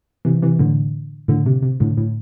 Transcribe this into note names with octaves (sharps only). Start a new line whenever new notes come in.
C3 E3
C3 E3
A2 D3
A2 D3
C3
C3
A2 D3
A2